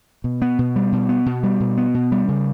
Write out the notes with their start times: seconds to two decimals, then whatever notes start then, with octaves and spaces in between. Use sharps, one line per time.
0.24 B2
0.42 B3
0.59 B2
0.76 G3
0.92 B2
1.09 B3
1.26 B2
1.43 G3
1.60 B2
1.77 B3
1.94 B2
2.12 G3
2.28 C#3